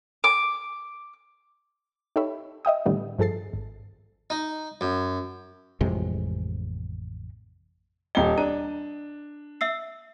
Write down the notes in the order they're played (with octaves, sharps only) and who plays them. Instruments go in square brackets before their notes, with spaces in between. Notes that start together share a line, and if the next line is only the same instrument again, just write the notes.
[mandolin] D6
[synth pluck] D#4 G4 A4 C#5 E5 B5
D#5 E5 G5 D#6
A2 D3 D#3 G3 A3 B3
G2 F3 G#4 A4 A6 C7
G#1
[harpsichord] D#4
F#2
[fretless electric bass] A1 F2 C3 G#3
[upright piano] D#1 G7 [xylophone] D#5 G5
[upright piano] D4 [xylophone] A#5
[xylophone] E5 E6 C7